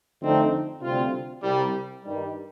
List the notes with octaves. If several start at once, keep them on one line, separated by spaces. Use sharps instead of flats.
F2 D3 A3 C4 D#4
D2 C3 G3 C4 F4
C2 C3 G3
G2 D#3 G3